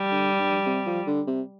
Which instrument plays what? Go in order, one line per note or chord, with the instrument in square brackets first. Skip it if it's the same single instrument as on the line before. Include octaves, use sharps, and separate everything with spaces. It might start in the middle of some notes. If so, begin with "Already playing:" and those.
Already playing: [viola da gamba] G3
[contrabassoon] D3
G2
C3
F3
D3
C3